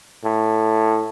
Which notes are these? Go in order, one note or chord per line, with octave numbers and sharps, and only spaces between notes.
A2